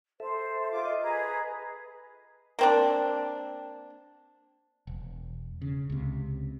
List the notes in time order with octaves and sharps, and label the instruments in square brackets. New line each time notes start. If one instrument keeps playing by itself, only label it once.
[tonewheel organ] A4 E5 [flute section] C5
[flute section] F4 D6
[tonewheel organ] D#5
[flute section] G#4 B4 A#5
[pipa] A#3 C4 D4
[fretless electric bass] E1
C#3
C#2 C3